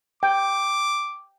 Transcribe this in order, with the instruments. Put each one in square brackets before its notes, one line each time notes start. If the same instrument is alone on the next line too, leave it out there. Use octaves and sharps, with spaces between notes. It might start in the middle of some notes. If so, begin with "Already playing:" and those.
[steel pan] G5 [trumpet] D6